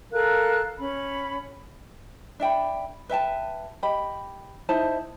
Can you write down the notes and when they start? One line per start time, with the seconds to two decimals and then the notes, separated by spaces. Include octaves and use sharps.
0.12 A4 A#4 F5 F#6
0.78 C#4 B5
2.40 D4 E5 G5 B5
3.09 B4 E5 G5 A5
3.83 G4 D#5 B5
4.69 D#4 E4 C5 A5